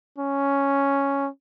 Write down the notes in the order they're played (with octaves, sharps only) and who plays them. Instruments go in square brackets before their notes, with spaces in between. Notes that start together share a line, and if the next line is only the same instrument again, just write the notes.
[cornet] C#4